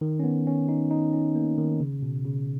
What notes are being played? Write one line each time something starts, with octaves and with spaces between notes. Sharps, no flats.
D#3
C#4
B3
C#4
D#4
D#4
C#4
A#3
D#3
C#3
B2
C#3